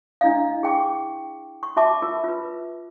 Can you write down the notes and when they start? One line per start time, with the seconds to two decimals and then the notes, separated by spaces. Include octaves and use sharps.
0.21 D4 E4 D#5 F5
0.63 G#4 G5 C#6 D6
1.63 C#6
1.76 F#4 E5 A5 D6
2.02 F4 A#4
2.24 F4 B4